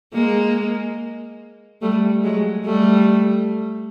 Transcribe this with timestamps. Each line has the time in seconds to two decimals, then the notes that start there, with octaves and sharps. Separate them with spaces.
0.14 G#3 A#3
1.82 G3 A3
2.23 F#3 G#3
2.65 G3 A3